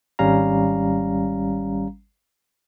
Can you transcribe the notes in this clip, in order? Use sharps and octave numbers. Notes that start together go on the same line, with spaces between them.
G#1 G3 C#4 F5 A#5